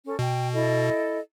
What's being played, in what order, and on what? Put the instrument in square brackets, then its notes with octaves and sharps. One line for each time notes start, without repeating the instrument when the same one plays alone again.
[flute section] C#4 A4
[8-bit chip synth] B2 [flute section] G5
[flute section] E4 A4 D#5